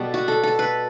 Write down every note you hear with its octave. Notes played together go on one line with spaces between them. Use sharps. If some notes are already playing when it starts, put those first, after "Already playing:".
Already playing: B2 G3 B3 A4
F#4
A4
A4
B4